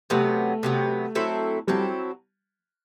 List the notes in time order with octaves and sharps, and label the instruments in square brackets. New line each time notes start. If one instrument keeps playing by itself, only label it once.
[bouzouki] C3 F#3 B3 [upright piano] A3
[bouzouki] C3 F#3 B3
F#3 C4 E4 A4
[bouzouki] F#3 C4 E4 A4 [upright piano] G3